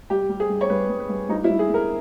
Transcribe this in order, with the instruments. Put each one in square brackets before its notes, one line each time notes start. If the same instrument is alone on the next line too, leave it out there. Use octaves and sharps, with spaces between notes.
[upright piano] G3 G4
G3
G#4
G2
C#5
G2 B4
G2
B4
G2
G2 D#4
E4
G2
G#4
G2 A#4